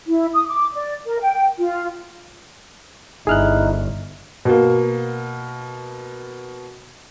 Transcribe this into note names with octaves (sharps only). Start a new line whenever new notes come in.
E4
D#6
D6
D5
A#4
G5
F4
G1 D#4 E4 G#4 F6 F#6
B2 A#3